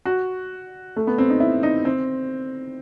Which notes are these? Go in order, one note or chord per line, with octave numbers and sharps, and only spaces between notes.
F#4
A3
B3
C4
D#4
E4
D#4
C4